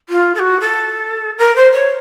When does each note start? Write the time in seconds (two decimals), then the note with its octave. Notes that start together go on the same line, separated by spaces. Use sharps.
0.09 F4
0.35 A4
0.39 F#4
0.60 A4
1.38 A#4
1.56 C5
1.72 C#5